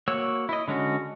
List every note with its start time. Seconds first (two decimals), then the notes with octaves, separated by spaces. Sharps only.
0.08 A#3 F#4 C#5 E6
0.49 E4 D#5
0.68 D3 G#3 C#4 F#4